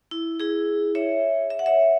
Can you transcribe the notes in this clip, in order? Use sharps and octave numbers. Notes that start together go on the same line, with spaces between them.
E4
E4 G#4
C#5 E5
E5
F#5
C#5 E5